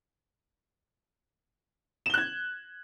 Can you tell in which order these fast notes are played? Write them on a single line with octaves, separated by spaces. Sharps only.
E7 G7 F#6 G#6